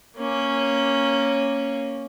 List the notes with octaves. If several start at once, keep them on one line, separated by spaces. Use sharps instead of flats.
A#3 C#4